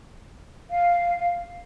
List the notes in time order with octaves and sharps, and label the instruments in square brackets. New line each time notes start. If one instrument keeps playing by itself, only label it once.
[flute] F5